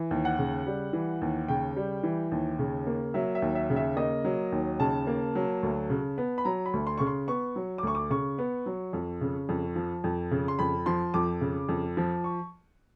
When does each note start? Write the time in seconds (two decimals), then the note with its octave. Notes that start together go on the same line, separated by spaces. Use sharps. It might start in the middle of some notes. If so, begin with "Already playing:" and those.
Already playing: E3
0.11 D#2
0.25 F#5
0.39 C#3
0.67 G3
0.93 E3
1.21 D#2
1.48 C#3 G5
1.76 G3
2.03 E3
2.32 D#2
2.59 C#3
2.87 A#3
3.14 F#3 E5
3.35 E5
3.42 D#2
3.55 E5
3.70 C#3
3.76 E5
3.97 A#3 D#5
4.24 F#3
4.52 D#2
4.80 C#3 A5
5.07 A#3
5.35 F#3
5.63 D2
5.90 C#3
6.18 B3
6.38 B5
6.45 F#3 A#5
6.66 B5
6.73 D2
6.87 C6
6.98 C#3 C#6
7.07 C6
7.28 B3 C#6
7.56 F#3
7.78 D6
7.83 D2 C#6
7.95 D6
8.10 C#3 C#6
8.38 B3
8.66 F#3
8.93 F2
9.21 C#3
9.49 F2
9.76 F3
10.04 F2
10.31 C#3
10.48 C6
10.59 F2 B5
10.86 F3 C6
11.14 F2 D6
11.41 C#3
11.69 F2
11.97 F3
12.24 C#6